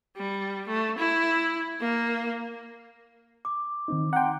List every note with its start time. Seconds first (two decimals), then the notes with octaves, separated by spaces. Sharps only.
0.17 G3
0.67 A3
0.98 E4
1.80 A#3
3.45 D6
3.88 D#3 C4 D#4
4.13 F#5 G5 A#5 C6